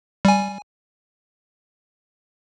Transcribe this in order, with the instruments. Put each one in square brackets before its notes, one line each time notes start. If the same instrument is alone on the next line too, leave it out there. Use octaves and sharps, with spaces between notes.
[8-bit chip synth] G3 G#5